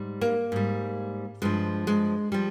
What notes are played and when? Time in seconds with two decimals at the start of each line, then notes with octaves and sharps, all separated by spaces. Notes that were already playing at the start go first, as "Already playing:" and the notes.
Already playing: G#2 G3
0.21 A#3
0.52 G#2 G3
1.42 G2 F3 G#3
1.87 G#3
2.32 F3 G3